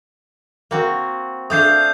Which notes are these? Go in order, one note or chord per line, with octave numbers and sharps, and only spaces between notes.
A#3 C4 F#4
A3 D4 F5 D#6 G6 C7